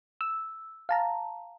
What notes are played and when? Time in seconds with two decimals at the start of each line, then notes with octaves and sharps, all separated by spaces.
0.21 E6
0.89 F5 A5 A#5